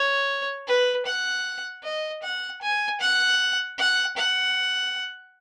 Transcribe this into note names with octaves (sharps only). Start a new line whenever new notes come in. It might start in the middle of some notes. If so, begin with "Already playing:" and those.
Already playing: C#5
B4
F#5
D#5
F#5
G#5
F#5
F#5
F#5